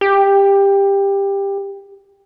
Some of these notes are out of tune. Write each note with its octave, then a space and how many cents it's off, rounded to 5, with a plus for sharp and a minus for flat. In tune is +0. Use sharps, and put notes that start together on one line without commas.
G4 +15